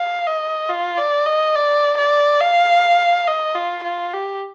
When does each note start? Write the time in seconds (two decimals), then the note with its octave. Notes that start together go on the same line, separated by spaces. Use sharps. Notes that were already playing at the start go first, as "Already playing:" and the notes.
Already playing: F5
0.27 D#5
0.69 F4
0.98 D5
1.26 D#5
1.55 D5
1.98 D5
2.41 F5
3.27 D#5
3.55 F4
3.84 F4
4.13 G4